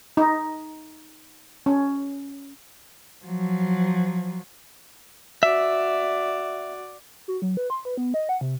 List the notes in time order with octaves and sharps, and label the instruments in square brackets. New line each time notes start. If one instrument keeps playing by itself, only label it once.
[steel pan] D#4
C#4
[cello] F3 F#3
[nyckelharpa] F#4 D5 [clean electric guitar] E5
[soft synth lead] F#4
F#3
B4
C6
B4
B3
D#5
F#5
C3